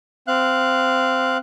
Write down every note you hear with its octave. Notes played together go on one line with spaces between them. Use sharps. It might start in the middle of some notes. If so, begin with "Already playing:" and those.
C4 F5 F#6